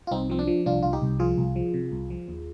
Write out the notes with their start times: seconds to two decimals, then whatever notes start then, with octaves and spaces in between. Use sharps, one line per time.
0.07 F4
0.11 C2 C4 D#4
0.30 F3 C4
0.39 D4
0.47 F3
0.66 C2 D4 F4
0.83 C2 F4
0.93 D#4 G4
1.02 C2
1.19 F3 F4 G#4
1.38 C2
1.56 F3
1.74 C3
1.92 C2
2.10 F3
2.28 D#2